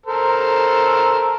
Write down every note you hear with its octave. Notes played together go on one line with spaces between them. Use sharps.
A4 A#4 C5